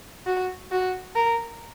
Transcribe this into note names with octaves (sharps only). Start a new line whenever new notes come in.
F#4
F#4
A#4